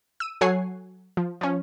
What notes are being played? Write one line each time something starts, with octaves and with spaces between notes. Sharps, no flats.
E6 D#7
F#3 A4 C#5 F#5 G#5 C7
F3
F3 C#4